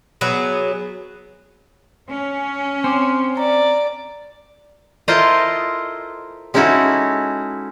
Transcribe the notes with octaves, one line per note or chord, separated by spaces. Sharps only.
F#3 B3 G#4
C#4
C4 C6 D6
D5 A#5
E4 F4 A4 A#4 C5 D#5
G#3 C#4 D#4 E4 F#4 A4